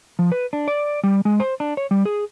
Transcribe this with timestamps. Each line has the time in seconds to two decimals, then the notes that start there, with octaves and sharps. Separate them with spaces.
0.19 F3
0.32 B4
0.53 D4
0.68 D5
1.04 G3
1.25 G#3
1.40 C5
1.60 D4
1.77 C#5
1.91 G3
2.05 G#4